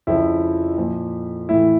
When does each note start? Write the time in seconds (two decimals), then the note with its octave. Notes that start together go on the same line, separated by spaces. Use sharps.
0.07 F2 C#3 F3 E4
0.78 A#2 F3
1.49 A2 E3 E4